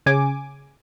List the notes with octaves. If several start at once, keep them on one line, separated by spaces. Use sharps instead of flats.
C#3 G#5 D6